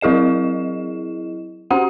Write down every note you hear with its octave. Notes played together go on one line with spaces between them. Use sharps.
F#3 E4 G#4 D#5 E7
C#4 F#4 F#5